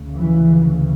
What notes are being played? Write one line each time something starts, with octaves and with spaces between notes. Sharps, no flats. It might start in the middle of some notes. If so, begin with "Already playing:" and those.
Already playing: D2 C#3
E3
E3